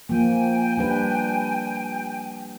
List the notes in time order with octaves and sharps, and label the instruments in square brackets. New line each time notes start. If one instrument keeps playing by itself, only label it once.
[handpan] F3 A#3 [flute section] G5 G#5
[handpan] G3 D4 B4